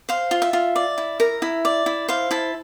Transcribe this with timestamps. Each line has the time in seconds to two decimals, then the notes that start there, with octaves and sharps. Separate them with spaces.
0.09 C5 F5
0.31 F4
0.42 E5
0.53 F4
0.76 D5
0.98 E4
1.20 A#4
1.42 E4
1.65 D5
1.86 E4
2.09 C5 F5
2.31 E4 A5